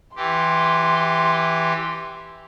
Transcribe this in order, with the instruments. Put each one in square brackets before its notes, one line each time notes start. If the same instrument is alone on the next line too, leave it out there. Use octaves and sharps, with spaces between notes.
[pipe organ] E3 G4 [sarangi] C6